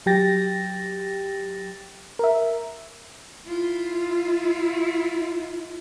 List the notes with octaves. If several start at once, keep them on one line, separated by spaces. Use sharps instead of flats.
F#3 G4 G5 A6 A#6
A#4 E5
E4 F4